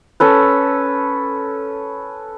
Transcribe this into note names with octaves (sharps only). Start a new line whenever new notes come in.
C#4 A4 B4